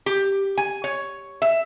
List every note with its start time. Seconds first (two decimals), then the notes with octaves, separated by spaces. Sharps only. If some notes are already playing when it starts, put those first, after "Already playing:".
0.06 G4
0.58 G#5
0.84 C#5
1.42 E5